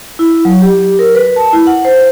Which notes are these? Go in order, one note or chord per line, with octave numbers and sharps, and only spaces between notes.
E4
F#3
G4
A#4
B4
A5
E4
F#5
C5